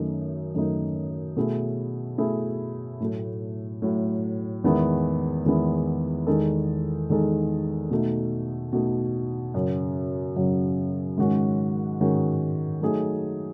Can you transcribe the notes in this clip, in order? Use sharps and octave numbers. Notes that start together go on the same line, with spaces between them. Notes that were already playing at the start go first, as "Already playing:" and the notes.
Already playing: F#2 D#3 A3 D#4
F#2 D#3 A3 D#4
B2 A3 E4 G#4
B2 A3 E4 G#4
A2 F#3 A3
A2 F#3 A3
E2 D#3 G#3 B3 E4
E2 D#3 G#3 B3 E4
E2 D#3 G#3 D#4 A4
E2 D#3 G#3 D#4 A4
B2 A3 D#4
B2 A3 D#4
F#2 C#3 F#3
F#2 C#3 F#3
G#2 D#3 G#3 C#4 F#4
G#2 D#3 G#3 C#4 F#4
F#3 A3 D#4 G#4